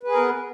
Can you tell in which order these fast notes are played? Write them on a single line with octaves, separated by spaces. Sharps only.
B4 G#4 A#4 B3